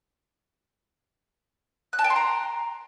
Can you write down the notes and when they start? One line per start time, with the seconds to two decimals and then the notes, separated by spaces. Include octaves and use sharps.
1.93 F#6
1.99 A5
2.04 G5
2.10 C6
2.16 A#5